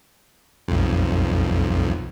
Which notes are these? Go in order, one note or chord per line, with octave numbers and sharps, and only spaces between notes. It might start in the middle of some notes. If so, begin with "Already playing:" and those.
B1 F2